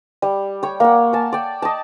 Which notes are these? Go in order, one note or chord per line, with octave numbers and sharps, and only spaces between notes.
G3
C#5 G5
A#3 F#5
G#5 A5
D5 G5
D#5 A5